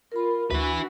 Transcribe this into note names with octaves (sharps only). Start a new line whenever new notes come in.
F4 A#4 B5
D2 D4 E4 F#4 B4